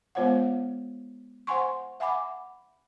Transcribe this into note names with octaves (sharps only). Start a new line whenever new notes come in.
G#3 B3 F4 C5 C#5 F#5
C5 F#5 G#5 C6 C#6
E5 F#5 G#5 B5 D6